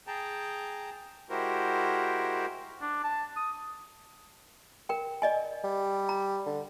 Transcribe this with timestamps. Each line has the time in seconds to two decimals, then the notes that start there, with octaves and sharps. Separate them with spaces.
0.07 G#4 G5 A5 A#5
1.30 G#3 E4 F#4 G4 A#4 C5
2.82 D4
3.04 A5
3.36 D#6
4.89 A#4 G5
5.22 D5 D#5 G#5
5.64 G3
6.09 A#5
6.46 D3